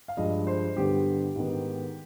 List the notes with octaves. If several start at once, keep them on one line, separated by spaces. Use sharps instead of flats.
F5
G2 F3 G#3 D#5
C5
G2 D3 G3 B3 G4
G#2 D#3 B3